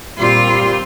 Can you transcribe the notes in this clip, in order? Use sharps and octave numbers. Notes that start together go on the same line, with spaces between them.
A#2 G3 C4 F4 C6